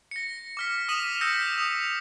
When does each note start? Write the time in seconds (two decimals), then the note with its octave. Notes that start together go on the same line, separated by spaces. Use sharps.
0.11 A#6 C#7
0.57 D6 F6 B6
0.89 D#6 F6 B6 D#7 E7 F#7
1.21 D#6 E6 G6 A#6 B6 C#7
1.58 D#6 F7